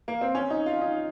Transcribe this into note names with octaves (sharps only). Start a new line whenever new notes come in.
A#3
C4
C#4
D#4
F4
D#4